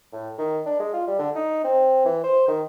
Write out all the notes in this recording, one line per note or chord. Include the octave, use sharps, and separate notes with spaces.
A2
D#3
D4
G#3
F4
G3
D3
D#4
C4
E3
C5
D#3